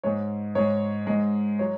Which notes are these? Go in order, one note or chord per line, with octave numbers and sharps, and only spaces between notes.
G#2 G#3 C#5
G#2 G#3 C#5
G#2 G#3
F#3 C#5